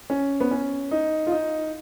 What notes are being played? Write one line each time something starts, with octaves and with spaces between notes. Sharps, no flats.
C#4
B3
C#4
D#4
F4
D#4